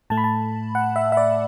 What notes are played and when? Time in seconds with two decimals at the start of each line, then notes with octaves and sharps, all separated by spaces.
0.10 A2 A3 A5
0.17 B5
0.24 A5
0.75 F#5
0.96 E5
1.12 E5
1.17 D5